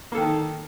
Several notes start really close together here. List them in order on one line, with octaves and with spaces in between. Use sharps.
A#3 A4 D#3